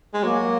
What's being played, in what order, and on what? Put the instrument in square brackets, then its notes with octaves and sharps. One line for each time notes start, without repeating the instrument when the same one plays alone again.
[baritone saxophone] G#3
[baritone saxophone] F#3 [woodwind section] A#3